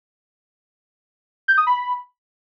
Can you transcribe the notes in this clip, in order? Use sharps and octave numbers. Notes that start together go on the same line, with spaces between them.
G6
D#6
B5